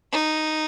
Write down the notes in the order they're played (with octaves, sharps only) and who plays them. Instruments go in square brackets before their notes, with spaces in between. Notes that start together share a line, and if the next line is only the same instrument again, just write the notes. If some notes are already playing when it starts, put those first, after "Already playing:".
[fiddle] D#4